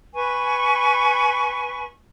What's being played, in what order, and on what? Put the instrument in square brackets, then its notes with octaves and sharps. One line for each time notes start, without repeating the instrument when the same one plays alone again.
[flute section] B4 G#5 C#6